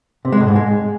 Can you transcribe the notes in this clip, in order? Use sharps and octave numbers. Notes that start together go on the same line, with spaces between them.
C3
G#3
A2
G#2
G#3